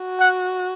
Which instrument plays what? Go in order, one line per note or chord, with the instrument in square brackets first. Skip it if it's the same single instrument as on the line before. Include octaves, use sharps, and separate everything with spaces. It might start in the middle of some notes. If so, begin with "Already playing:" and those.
Already playing: [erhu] F#4
[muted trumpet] F#5